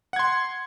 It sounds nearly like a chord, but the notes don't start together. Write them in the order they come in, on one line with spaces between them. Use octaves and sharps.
F#5 G#6 C6